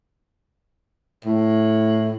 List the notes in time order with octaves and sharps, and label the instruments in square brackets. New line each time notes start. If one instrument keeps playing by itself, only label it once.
[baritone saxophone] A2